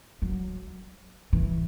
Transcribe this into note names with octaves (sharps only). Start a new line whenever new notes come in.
F#3
E3